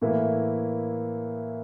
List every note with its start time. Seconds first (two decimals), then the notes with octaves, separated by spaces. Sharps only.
0.01 A2 E3 A#3 E4